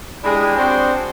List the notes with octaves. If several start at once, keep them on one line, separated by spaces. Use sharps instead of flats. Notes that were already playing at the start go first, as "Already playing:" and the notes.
G#3 D4 E4 G4 G#4
C4 D4 F#4 G#4 C5